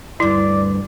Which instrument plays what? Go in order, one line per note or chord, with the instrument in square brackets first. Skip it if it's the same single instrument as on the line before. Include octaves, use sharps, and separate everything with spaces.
[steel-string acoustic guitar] D2 G2 [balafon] E4 [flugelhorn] D5